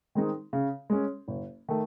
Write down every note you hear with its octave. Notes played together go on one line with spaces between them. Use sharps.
D#3 G#3 C4 D#4
C#3
G#3 C#4
F#1
D#3 A3